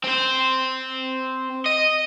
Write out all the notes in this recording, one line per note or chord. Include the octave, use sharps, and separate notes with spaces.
C4 C5
D#5